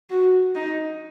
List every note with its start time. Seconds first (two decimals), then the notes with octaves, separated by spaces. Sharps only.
0.10 F#4
0.55 D#4